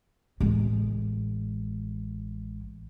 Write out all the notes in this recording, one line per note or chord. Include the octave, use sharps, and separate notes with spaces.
A1 G#3